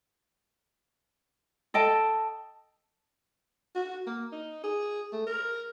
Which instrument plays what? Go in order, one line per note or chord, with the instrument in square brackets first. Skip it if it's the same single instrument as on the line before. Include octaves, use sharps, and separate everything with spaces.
[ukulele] A4 D#5 G5 A5
[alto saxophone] F#4
A#3
D#4
G#4
A3
A#4